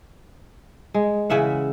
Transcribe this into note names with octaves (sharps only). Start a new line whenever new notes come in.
G#3
C#3 E3 E5 F#5